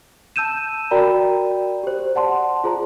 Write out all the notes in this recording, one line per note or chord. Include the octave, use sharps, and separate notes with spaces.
A5 E6 G6 D#7 E7
F#4 A#4 D5 G5 A#5 B5
G4 C5
D5 F#5 A5 C6
F4 G#4 C5 A#5